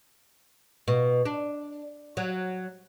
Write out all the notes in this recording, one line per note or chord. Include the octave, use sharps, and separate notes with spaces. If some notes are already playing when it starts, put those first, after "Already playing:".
B2
D4
F#3